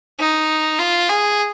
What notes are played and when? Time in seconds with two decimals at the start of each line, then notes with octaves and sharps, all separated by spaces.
0.19 D#4
0.79 F4
1.09 G#4